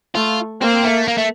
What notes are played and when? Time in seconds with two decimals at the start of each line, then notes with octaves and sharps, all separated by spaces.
0.16 A3 F4
0.61 A#3 C4
0.84 A3
1.08 A#3
1.18 A3